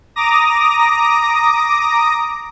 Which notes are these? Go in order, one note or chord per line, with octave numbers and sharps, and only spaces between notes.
A#5 D6 D#6 A#6